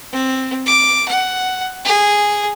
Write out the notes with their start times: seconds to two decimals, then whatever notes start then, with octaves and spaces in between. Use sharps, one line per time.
0.12 C4
0.66 D6
1.08 F#5
1.85 G#4